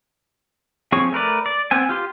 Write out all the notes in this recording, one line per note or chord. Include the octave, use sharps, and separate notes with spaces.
F3 C4 G#4 C#5 C#6
A3 A#4 B4 D5
D5
B3 C4 G#5
F4 G4 C6